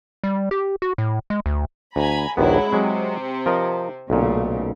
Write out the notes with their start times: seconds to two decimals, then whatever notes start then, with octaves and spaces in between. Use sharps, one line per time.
0.24 G3
0.51 G4
0.82 F#4
0.98 A2
1.30 G#3
1.46 D2
1.96 D2 G#5 A#5 B5
2.37 A#1 D#2 F#3 G#3 B3 E4
2.73 C3 F#3 G#3
3.46 F3 A#4 D#5
4.10 B1 A#2 C#3 A3